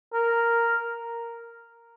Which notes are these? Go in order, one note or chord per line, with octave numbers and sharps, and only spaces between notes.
A#4